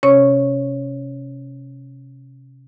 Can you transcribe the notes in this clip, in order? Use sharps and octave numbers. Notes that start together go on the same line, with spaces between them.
C3 C#4 C#5 C#6